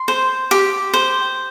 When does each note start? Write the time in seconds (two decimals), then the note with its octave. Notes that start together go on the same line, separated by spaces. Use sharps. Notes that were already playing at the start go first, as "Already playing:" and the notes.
Already playing: C6
0.08 C5
0.51 G4
0.94 C5